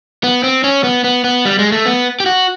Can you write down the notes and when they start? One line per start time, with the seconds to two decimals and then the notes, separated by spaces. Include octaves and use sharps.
0.23 B3
0.43 C4
0.64 C#4
0.84 B3
1.04 B3
1.24 B3
1.45 G3
1.59 G#3
1.72 A3
1.86 B3
2.20 G4
2.26 F#4